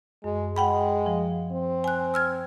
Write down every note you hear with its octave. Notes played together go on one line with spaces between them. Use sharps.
F#2 G#3
G#3 F#5 G5 B5
F3
C4
G#5 F#6
E6 F6 G#6